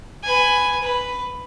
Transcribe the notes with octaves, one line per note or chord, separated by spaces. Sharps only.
B4 G#5
B4